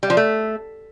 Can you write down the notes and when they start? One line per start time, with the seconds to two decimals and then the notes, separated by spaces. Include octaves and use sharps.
0.03 G3
0.10 F3
0.17 A3